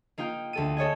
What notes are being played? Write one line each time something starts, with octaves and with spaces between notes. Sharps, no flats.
A#3 D#4 F4 G5
D2 A4 D#7
A4 C#5 D#5 G#5